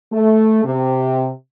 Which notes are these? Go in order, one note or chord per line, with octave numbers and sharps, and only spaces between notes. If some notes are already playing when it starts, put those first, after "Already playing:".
A3
C3